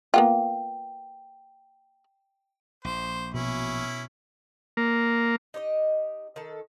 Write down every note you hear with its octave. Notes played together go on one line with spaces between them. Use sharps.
A#3 B3 F4 G5
A#1 C5
B2 C#4 E4
A#3
D#4 G4 C#5 D#5
D#3 A4